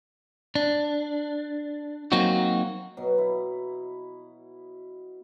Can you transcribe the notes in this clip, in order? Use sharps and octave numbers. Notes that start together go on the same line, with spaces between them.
D4
F#3 A#3 C4 D#4 F#4
B2 F#3
E4